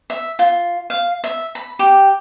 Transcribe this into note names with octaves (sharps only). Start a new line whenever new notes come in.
E5
F4
F5
E5
B5
G4